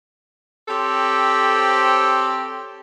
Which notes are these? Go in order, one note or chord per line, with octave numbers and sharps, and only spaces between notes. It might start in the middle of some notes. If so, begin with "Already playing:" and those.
C4 G4 A4 C5 C#5